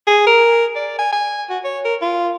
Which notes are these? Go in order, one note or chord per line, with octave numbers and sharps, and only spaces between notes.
G#4
A#4
D5
G#5
G#5
F#4
C#5
A#4
F4